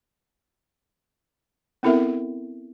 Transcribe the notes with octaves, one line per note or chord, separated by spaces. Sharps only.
B3 C4 E4 A4 A#4 E5